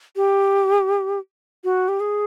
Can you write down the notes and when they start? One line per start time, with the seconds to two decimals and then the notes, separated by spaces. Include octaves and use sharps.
0.16 G4
1.64 F#4
1.88 G4
2.00 G#4